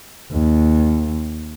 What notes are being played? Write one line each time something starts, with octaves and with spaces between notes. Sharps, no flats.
D#2